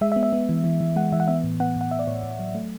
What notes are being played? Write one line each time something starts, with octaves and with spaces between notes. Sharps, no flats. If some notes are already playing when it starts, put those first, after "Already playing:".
G#3 E5
E5
B3
E5
B3
E3
E3
E3
G#3 F#5
E3 E5
F#5
B3 E5
A2
B3 F#5
A2 F#5
A2 E5
D5
A2 C#5
A2
F#3
A3